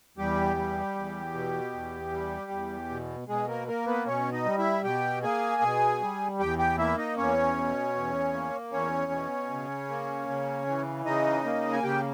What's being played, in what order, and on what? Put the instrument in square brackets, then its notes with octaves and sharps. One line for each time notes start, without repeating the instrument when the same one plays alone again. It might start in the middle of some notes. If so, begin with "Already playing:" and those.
[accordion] E2 G3 G4
G3
E2
B2
E2
G3
E2
B2
B2 G#3 G#4
A#3 A#4
A#3 A#4
B3 B4
B2 C#4 C#5
D#4 D#5
G3
E4 E5
B2 G4 G5
A#3 G#4 G#5
B2
G3
E2 G4 G5
G4 G5
A#3 E4 E5
D#4 D#5
E2 C#4 C#5
B2
E2
A#3
E2 C#4 C#5
B2
C#3
A#3
C#3
E3
C#3 D#4 D#5
A#3
G#5
C#3 G4 G5